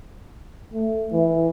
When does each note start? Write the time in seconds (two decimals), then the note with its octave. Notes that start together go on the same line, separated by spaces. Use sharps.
0.74 A3
1.12 E3